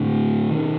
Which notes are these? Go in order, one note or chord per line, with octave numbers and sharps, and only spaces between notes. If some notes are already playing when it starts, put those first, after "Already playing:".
Already playing: A2 D3
B2 D#3